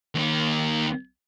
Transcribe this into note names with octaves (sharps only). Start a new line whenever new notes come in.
D#2 D#3